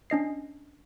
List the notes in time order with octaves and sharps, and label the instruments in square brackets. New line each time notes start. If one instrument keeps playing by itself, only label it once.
[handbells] C#4 D4 D#5 C7